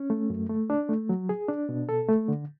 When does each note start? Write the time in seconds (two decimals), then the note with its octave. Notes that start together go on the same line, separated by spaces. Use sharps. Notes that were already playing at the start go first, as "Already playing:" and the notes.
Already playing: C#4
0.10 A3
0.30 F#2
0.49 A3
0.70 D4
0.89 A3
1.09 F#3
1.29 G#4
1.48 D4
1.69 B2
1.89 A4
2.08 A3
2.28 D3